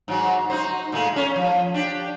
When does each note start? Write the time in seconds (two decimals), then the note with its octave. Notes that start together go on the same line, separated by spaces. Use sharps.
0.08 G#2 F#3 F#4
0.50 D#4 F#4 C5
0.92 A#2 G#3 A3
1.16 C#4 C#5
1.36 F3
1.74 D4 G4